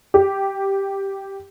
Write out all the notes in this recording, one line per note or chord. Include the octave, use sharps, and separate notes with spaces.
G4